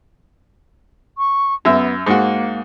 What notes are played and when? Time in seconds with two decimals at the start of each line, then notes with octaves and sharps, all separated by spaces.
1.18 C#6
1.65 F#2 B3 E5 E6
2.06 G#2 A#3 F#4